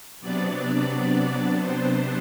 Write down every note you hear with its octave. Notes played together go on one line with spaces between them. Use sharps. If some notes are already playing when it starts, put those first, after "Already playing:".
C3 F#3 B3 D4 D5
C5